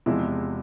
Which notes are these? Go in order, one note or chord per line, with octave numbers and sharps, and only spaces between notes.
E2 C3 F3 G#3 E4